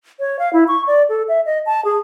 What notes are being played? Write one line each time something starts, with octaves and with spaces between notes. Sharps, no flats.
C#5
F5
E4
C#6
D5
A4
E5
D#5
A5
G#4